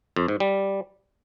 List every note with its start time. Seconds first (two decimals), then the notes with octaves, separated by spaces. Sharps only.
0.16 F2
0.28 G#2
0.40 G3